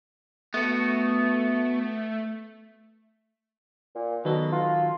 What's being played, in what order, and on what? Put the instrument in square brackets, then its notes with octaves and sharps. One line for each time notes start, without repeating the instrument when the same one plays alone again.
[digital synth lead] A3 [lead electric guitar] B3 F#4
[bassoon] A#2
[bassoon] B2 [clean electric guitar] D#3 F#3 A4
[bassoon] F4